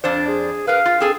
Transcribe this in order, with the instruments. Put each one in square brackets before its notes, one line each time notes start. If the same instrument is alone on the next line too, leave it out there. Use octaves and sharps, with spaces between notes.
[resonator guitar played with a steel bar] F2 D4 C5 [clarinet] D5
[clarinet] G#4
[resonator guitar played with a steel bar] A#4 B4 [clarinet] F5
[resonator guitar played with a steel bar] F4
C4 G#4 A4